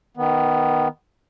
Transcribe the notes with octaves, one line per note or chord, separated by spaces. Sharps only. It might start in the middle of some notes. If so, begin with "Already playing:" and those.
D#3 B3